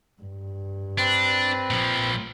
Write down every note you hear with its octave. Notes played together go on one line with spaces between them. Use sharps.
G2
C4 D4 B4
A#2 F3